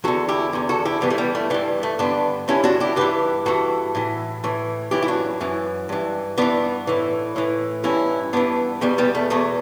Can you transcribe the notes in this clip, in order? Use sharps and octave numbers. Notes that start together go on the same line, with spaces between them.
E2 D3 F#4 A4
E4 G4
E2 D3
F#4 A4
E4 G4
G2 E3 G3 B3
A3
G3 B3
A3
G2 E3 G3
A3
G2 D3 B3 D4
G2 D3 C#4 E4
D4 F#4
E4 G4
G2 E3 G4 B4
G2 E3 F#4 A4
A2 E3
A2 E3
F#2 E3 E4 G4
E4
D4 F#4
F#2 E3
G2 E3
G2 E3 B3 D4
A2 E3
A2 E3
G2 E3 C#4 E4
G2 E3 B3 D4
E2 B2 G3 B3
G3 B3
A3
E2 B2 A3